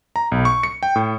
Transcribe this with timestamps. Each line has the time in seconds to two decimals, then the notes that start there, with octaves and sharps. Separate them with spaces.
0.16 A#5
0.32 B1
0.45 C#6
0.63 C#7
0.83 G5
0.96 A2